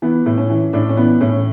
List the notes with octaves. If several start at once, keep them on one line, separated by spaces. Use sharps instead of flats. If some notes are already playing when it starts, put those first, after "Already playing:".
E3 B3
A2
C#4
E3
A2 D4
C#4
E3 B3
A2 C#4